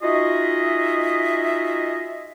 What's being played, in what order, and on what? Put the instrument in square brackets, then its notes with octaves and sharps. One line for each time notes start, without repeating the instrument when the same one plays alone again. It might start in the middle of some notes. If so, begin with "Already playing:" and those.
[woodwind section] D#4 F4 F#4 G#4 D#5 E5